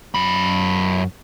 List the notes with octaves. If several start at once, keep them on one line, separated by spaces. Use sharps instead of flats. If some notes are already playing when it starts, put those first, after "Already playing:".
F#2 B5